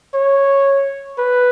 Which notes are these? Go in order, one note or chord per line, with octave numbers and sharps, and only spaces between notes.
C#5
B4